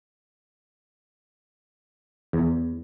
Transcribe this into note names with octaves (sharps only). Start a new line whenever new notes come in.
E2